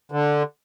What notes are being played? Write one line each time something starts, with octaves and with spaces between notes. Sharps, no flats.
D3